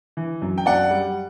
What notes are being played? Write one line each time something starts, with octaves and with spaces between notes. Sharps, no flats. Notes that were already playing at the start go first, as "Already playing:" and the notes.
E3
F#2
G5
F#2 D5 F#5
G3